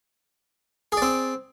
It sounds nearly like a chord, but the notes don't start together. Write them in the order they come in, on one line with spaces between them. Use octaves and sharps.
G#4 D5 C4